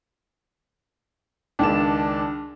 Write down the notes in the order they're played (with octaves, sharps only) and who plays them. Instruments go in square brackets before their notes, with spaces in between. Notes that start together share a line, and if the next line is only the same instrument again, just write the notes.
[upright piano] C#2 D#3 E7 [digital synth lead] D4